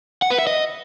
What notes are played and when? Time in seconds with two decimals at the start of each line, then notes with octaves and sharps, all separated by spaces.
0.22 F#5
0.30 B4
0.39 E5
0.47 D#5